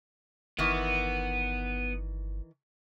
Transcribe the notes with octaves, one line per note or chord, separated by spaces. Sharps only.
G1 D#3 E3 B3